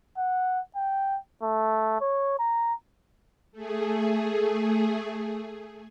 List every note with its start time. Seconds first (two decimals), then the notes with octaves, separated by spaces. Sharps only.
0.18 F#5
0.76 G5
1.43 A3
2.01 C#5
2.39 A#5
3.52 A3 G#4